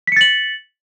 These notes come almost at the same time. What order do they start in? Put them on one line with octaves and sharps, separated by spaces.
B6 C#7 A6 F#7